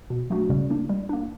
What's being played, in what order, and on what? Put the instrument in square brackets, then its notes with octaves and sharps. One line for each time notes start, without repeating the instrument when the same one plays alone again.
[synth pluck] B2
F#3 A3 D4 F#4
[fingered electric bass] C#3 [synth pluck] G3
[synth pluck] A#3 D4
G3
A#3 D4